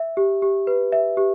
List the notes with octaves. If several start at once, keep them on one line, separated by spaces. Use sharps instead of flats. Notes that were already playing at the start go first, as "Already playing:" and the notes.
Already playing: E5
G4
G4
B4
E5
G4